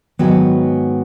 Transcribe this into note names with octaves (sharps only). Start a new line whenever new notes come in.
G#2 D#3 F#3 B3